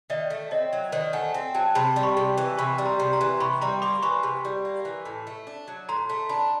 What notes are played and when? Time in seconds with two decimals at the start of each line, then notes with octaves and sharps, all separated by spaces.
0.10 D#3 D5 E5
0.30 A3
0.51 C4 C#5 D#5
0.73 F#3
0.92 D#3 C5 D5
1.13 A3 F#5 G#5
1.34 C4
1.55 F#3 G5 A5
1.75 C3 A5 B5
1.96 G3
2.03 B5 C#6
2.17 C3
2.38 E3
2.58 C3 B5 C#6
2.78 G3
2.86 A#5 C6
3.00 C3
3.13 A#5 C6
3.21 E3
3.40 C3 B5 C#6
3.61 G3 A#5 C6
3.82 A#3 C6 D6
4.02 E3 B5 C#6
4.23 C3
4.45 G3
4.65 A#3
4.85 E3
5.05 A2
5.27 A3
5.47 D4
5.68 F#3
5.89 A2 A#5 C6
6.09 A3
6.29 D4 A5 B5